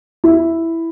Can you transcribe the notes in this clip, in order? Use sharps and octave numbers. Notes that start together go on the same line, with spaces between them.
E4